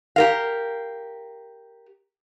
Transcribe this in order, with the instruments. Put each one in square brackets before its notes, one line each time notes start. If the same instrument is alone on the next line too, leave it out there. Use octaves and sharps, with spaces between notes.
[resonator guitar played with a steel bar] G4 A#4 F5